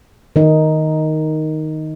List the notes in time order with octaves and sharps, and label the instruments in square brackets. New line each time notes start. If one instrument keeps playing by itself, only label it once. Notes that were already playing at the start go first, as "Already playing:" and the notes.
[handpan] D#3 D#4